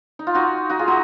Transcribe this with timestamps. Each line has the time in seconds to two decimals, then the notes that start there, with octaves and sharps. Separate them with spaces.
0.19 D#4
0.27 F4
0.35 D#4 F#4
0.70 D#4 F#4
0.79 F4 G#4
0.88 D#4 F#4